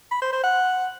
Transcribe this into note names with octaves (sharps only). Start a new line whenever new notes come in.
B5
C5
C5
F#5